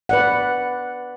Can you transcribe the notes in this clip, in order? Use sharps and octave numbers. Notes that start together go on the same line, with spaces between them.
B4 D5 F#5